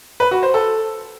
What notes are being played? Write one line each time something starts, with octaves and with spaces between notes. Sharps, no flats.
B4
F#4
C5
A4